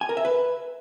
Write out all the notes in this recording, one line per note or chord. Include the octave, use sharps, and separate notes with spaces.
G#5
A#4
E5
B4